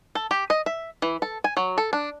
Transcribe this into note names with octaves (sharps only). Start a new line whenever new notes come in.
A4
G4
D#5
E5
E3
A4
G#5
F#3
A4
D4